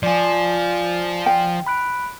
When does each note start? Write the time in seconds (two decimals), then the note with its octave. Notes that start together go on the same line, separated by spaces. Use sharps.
0.03 F3 F4 D5 G#5
1.26 G5
1.66 B5 F#6 D7